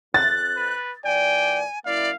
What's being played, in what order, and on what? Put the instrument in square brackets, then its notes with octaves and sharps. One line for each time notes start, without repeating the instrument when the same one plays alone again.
[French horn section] F2 [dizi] F#6 [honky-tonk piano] A6
[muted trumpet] B4
[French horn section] A#2 E3 D5 [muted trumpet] G5 [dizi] G#5
[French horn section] F#2 A#3 E4 [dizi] D5 [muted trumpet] F5